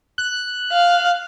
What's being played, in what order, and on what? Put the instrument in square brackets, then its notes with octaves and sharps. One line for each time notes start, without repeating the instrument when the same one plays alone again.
[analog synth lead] F#6
[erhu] F5